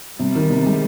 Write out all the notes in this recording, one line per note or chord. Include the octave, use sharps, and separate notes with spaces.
C3 G3
D#3
C3
G#3